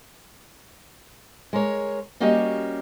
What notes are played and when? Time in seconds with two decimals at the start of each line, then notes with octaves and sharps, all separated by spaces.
1.53 G#3 A#4 C#5
2.20 G3 A#3 C#4 F#4 G4 D#5